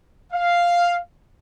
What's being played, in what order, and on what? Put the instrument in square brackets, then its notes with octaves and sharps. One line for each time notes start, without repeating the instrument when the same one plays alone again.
[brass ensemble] F5